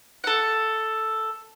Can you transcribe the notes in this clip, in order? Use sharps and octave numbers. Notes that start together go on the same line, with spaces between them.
A4 F#5